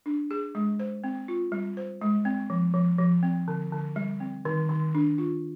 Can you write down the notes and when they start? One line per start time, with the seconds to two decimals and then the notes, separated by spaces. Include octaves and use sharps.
0.06 D4
0.31 G#4
0.55 G#3
0.80 C5
1.04 C4
1.28 F4
1.52 G3
1.77 C5
2.01 G#3
2.25 C4
2.50 F3
2.74 F3
2.98 F3
3.23 C4
3.48 D3
3.72 D3
3.96 G3
4.20 C4
4.45 D#3
4.69 D#3
4.95 D4
5.18 F4